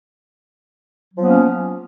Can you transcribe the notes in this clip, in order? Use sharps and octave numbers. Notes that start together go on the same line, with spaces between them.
F3 F#3 A#3 B3 C#4